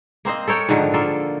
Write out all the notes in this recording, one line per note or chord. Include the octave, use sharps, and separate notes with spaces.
A#3 C4 C5 D#5
A4 A#4 C#5 G5
G#2 D3 D#3 F3
A#3 F4 A4